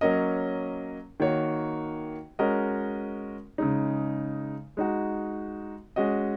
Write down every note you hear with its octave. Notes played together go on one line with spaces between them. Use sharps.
F#3 A#3 C#4 A#4 D#5
D#3 A#3 F#4 C#5
G#3 C#4 F#4 A#4 D#5
C#3 G#3 D#4
G#3 D#4 F#4
G#3 C#4 F#4 D#5